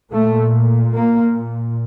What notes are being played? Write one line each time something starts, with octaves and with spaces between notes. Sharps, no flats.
A#2 A3
A#3